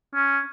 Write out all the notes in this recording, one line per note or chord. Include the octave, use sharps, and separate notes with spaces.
C#4